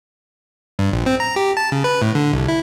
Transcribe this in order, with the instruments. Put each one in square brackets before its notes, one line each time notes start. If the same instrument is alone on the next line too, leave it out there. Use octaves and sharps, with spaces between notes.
[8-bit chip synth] G2
A#1
C4
A#5
G4
A5
C#3
B4
A2
D3
C2
E4